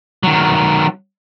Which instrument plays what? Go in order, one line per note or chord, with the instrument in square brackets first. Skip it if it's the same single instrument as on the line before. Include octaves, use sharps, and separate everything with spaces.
[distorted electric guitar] D#3 F#3